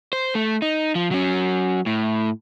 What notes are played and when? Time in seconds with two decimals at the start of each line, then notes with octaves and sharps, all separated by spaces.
0.13 C5
0.35 A3
0.62 D#4
0.95 F3
1.11 F#3 C#4
1.86 A2